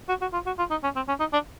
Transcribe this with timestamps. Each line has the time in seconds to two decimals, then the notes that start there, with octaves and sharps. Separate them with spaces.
0.09 F#4
0.21 F#4
0.33 F4
0.46 F#4
0.58 F4
0.71 D#4
0.83 C#4
0.96 C4
1.08 C#4
1.20 D#4
1.33 D4